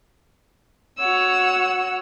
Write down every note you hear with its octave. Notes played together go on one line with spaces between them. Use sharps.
F#4 C#5 F#5 E6